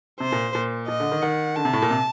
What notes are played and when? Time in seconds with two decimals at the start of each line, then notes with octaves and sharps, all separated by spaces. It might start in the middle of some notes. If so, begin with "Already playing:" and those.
0.20 C3 C5
0.32 A#2
0.55 A#2
0.88 A#2 D#5
1.00 D3
1.12 D#3
1.22 D#3 F#5
1.56 D3 A5
1.65 C3
1.73 A2
1.82 A#2
1.91 C3